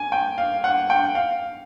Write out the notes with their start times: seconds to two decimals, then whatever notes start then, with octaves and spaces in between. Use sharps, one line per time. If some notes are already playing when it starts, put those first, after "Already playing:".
Already playing: G#5
0.12 G5
0.38 F5
0.64 F#5
0.90 G5
1.15 F5